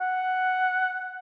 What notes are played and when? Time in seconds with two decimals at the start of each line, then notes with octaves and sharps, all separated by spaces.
0.01 F#5